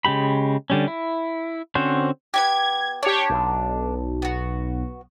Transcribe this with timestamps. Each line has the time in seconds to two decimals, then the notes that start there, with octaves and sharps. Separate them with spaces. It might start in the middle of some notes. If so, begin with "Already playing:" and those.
0.05 C#3 G#3 G4 B5
0.70 D3 G3 C#4
0.88 E4
1.75 D3 C4 C#4 F#4 C5
2.34 B3 D4 G4 G#6
3.03 D4 G4 C#5
3.30 B1
4.22 B3 F#4